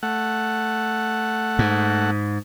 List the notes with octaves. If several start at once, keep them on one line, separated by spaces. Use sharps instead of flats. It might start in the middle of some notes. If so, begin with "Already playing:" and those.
A3 F#5
G#2